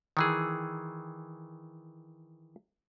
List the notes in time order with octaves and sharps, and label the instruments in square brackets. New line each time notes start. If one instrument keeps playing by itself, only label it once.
[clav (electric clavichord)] D#3 E3 G#4